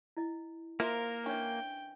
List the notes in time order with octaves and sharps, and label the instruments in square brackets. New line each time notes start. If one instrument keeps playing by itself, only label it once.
[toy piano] E4 D#5
[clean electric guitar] A#3 [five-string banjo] F4 C5 E5 [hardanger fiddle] A#4
[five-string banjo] E3 C#4 [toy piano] D4 C#5 D#5 [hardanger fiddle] G5